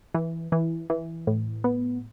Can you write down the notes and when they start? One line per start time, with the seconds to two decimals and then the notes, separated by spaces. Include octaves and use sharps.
0.14 E3
0.52 E3
0.90 E3
1.27 A2
1.64 B3